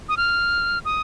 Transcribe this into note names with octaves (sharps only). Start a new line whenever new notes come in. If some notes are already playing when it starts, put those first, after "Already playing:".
D#6
F6
D#6